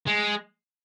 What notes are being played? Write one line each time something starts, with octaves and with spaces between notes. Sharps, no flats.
G#3